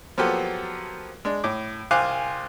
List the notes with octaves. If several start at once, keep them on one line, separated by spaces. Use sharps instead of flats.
F3 F#3 A#3 B3 G4 A4
G#3 D4
A2 D6
C2 C5 F5 G#5 D6 F#6